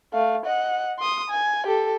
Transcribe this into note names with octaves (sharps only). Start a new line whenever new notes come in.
A3 F5
D#5 F#5
C6 D#6
G#5
G4 A4